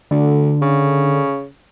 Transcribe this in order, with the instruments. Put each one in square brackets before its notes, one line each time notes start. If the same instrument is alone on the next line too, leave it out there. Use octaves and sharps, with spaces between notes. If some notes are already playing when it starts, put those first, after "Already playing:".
[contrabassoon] D2 [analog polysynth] D3
[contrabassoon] C#3